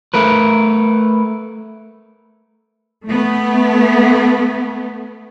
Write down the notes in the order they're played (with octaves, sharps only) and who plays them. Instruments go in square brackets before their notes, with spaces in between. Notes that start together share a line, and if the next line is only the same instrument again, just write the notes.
[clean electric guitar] A3 A#4 B4
[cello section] A3 B3